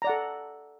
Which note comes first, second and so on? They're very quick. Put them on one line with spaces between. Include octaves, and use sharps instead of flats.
A#5 D5 F#5 A4